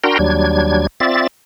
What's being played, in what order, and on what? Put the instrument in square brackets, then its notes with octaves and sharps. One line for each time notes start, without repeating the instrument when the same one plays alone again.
[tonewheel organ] D4 F#4 A#4 G5 A#5 C6
D#2 F#3 G3 D4 G#6
C4 F4 D5 E5 A6